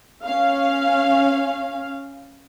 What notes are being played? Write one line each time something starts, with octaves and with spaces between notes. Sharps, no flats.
C#4 F5